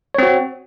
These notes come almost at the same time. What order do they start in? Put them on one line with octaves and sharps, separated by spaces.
C#5 C4 F#4